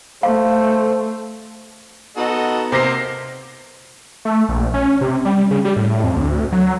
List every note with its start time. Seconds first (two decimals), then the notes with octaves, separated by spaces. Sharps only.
0.23 A3 C5 F5
2.17 B3 D#4 F#4 A4 D#5
2.72 C3 A#3 C5 A#6 C7
4.25 A3
4.49 A#1
4.74 C#4
5.01 C3
5.25 G3
5.51 C#3
5.65 G3
5.76 A2
6.04 F2
6.16 D2
6.52 F#3